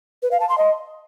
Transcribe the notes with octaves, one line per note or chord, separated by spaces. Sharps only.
B4
F5
A5
C6
D#5